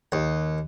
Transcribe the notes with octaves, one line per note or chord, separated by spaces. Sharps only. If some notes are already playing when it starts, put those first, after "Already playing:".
D#2